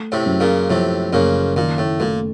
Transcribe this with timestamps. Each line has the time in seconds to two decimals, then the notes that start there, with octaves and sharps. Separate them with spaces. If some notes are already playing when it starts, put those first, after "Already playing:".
Already playing: A3
0.12 A2 C3
0.26 F#2
0.40 A#2 C#3
0.70 A2 C3 F3
1.13 F#1 A#2 C#3
1.56 A#2 D#3
1.78 A2
2.00 A#2 A3